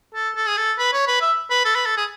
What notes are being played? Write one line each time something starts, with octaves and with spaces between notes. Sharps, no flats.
A4
A4
G#4
A4
B4
C#5
B4
E5
B4
A4
B4
A4
G#4